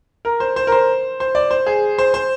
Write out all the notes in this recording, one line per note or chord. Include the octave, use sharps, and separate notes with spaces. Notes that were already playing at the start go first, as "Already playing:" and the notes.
A#4
C5
C5
A#4
C5
C5
D5
C5
G#4
C5
C5